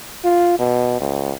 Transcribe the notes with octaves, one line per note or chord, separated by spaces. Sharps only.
F4
B2
C#2